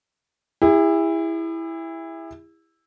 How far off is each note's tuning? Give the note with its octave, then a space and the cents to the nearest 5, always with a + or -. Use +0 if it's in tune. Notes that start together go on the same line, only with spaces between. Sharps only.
E4 +0 G#4 -45